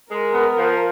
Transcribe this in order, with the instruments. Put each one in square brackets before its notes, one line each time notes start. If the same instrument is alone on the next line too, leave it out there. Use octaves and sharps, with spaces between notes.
[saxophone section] G#3 [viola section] A#4
[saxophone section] B3
F3